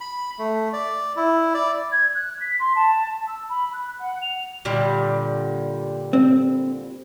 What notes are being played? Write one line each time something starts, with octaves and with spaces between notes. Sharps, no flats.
B5
A3
D5
E4
D5
G#6
F#6
B6
C6
A5
E6
B5
F#6
F#5
F7
A#2 D3 G3
C4